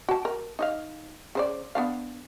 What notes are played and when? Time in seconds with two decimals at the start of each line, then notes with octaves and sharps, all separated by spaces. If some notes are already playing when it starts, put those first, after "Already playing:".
0.09 F#4 A5
0.25 A#4
0.59 D#4 D#5 F5
1.35 C#3 C5 D5
1.75 B3 D4 F5